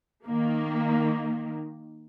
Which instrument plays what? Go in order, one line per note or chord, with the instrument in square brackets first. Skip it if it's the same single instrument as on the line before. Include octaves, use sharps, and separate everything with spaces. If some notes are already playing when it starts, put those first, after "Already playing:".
[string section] D#3 A#3